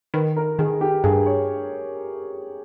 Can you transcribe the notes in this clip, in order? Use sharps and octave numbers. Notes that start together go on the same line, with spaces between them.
D#3 B4
A#4
D#3 G#4
G4
G2 G#4
C#5